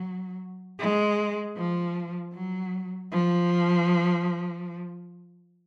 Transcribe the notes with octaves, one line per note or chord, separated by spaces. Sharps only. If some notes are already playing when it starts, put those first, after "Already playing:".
Already playing: F#3
G#3
F3
F#3
F3